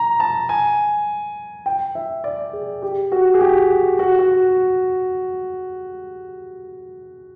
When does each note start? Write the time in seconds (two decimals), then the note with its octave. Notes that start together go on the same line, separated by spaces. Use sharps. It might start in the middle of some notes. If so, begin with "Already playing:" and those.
Already playing: A#5
0.20 A5
0.49 G#5
1.66 G5
1.95 E5
2.24 D5
2.53 G#4
2.82 G4
3.12 F#4
3.34 G#4
3.41 G4
3.99 F#4
4.19 F#4